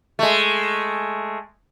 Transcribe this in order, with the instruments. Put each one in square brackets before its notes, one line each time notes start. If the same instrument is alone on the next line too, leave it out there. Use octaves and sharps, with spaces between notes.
[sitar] G#3 A3